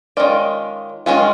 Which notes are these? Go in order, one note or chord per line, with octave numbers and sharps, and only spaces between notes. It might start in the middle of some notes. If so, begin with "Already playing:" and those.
D#3 G#3 C#4 F4 D5
D#3 G#3 C#4 F4